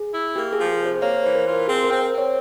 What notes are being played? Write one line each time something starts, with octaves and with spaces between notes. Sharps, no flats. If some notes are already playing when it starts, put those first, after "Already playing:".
Already playing: G#4
E4
A#3 G4
G#4
F3
G#4
C3
C5
A#3 C#5
E3 C5
A#4
F4
A#4
C4 G#4
A#4
C4
C5
C4
C#5